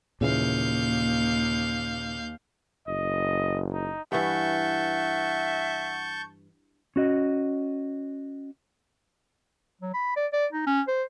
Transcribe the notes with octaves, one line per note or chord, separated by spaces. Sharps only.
D#2 A#2 C#3 E3 F5 G6
F#1 D#5
D#4
G2 E3 E5 F#5 A5 C#6 G6
C#4 F#4 D#5
F#3
B5
D5
D5
D#4
C#4
C5